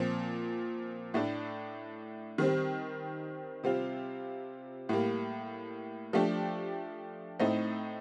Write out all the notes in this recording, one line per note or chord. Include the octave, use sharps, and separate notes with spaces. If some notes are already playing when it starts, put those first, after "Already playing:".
Already playing: A#2 F3 C4
A2 A3 D4
D#3 G3 C4
C3 G3 C4 F4
A2 G3 A#3
F3 A3 D4 G4
A2 A3 C4 D#4